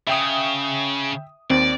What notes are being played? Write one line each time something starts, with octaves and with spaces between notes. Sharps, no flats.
C#3 E5 G5 D#6
D#2 C4 D5